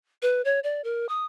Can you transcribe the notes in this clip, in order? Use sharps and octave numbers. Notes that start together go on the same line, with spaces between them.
B4
C#5
D5
A#4
D#6